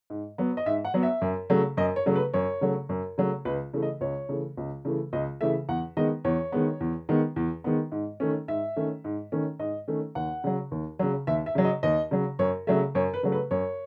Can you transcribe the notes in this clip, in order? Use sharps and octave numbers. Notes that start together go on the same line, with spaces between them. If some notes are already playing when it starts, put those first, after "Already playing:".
G#2
F#3 B3
D#5
G#2 E5
F#5
F#3 B3
E5
F#2
C#3 F#3 A3
F#2 D#5
C#5
C#3 F#3 A3
B4
F#2 C#5
C#3 F#3 A3
F#2
C#3 F#3 A3
C#2 B4
C#3 E3 A3
D#5
C#2 C#5
C#3 E3 A3
C#2
C#3 E3 A3
C#2 D#5
C#3 E3 A3 E5
E2 F#5
D#3 G#3 B3 D#5
E2 C#5
D#3 G#3 B3
E2
D#3 G#3 B3
E2
D#3 G#3 B3
G#2
D#3 A3 C#4
G#2 E5
D#3 A3 C#4
G#2
D#3 A3 C#4
G#2 D#5
D#3 A3 C#4
D#2 F#5
C#3 F#3
D#2
C#3 F#3
D#2 E5
E5
C#3 F#3
D#5
D#2 D#5
C#3 F#3
F#2 C#5
C#3 F#3 A3 E5
F#2 C#5
B4
C#3 F#3 A3
B4
F#2 C#5